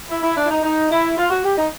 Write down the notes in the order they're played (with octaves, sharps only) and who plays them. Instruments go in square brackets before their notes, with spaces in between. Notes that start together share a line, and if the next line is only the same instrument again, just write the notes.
[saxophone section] E4
E4
D4
E4
D#4
D#4
E4
F4
F#4
G4
D#4